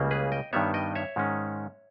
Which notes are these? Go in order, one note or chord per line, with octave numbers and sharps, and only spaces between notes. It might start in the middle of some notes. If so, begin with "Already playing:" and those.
Already playing: C#2 C#3 G3 A#3
G#4 B4
D#5 G5
G2 D#3 G3 B3 C#5 E5
D#5 G5
C#5 E5
G#2 D#3 G#3 C#4